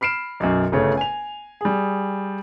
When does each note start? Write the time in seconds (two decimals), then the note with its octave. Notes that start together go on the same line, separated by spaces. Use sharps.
0.01 B5 F6 C7 D7 E7
0.40 B1 F#2
0.72 G1 C#3 A3 C#5
0.97 G#5 F7
1.61 G3 G#4